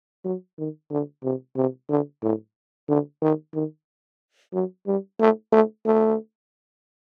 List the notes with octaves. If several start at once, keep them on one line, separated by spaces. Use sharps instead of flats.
F#3
D#3
D3
C3
C3
D3
A2
D3
D#3
D#3
F#3
G3
A3
A3
A3